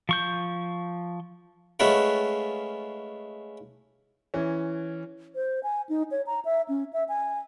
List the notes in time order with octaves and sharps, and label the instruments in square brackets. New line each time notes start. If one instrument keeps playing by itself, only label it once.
[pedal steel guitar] F3 C#6 G6
[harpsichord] G#3 A3 C#4 F4 B4 F#5
[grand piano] E3 C#4
[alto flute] C5
G#5
D#4
C#5
A#5
E5
C#4
E5
G#5